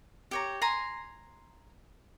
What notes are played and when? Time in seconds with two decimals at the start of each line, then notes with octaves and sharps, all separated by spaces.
0.31 G4 C#5 A#5
0.62 G#5 A#5 C6